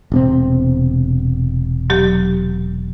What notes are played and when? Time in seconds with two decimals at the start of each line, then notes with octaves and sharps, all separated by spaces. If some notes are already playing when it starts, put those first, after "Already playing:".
0.12 E1 C3 C4
1.90 F#3 G4